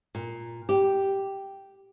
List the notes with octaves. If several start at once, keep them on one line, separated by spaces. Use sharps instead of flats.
A#2
G4